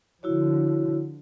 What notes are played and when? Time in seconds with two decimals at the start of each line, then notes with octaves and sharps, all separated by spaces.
0.23 D3 F3 E4 F#4 C#5